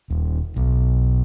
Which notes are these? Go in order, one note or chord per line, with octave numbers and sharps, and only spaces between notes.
D#1
B1